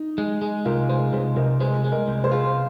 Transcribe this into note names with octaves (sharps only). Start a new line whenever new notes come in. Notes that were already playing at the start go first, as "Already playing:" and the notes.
Already playing: D#4
G#3
G#3
C2 F4 A#4
G#3 G#4 C5
C2 G#4 C5
C2 A#4 D#5
G#3 G#4 C5
G#3
A#4 D#5
C2
G#4 C5
F4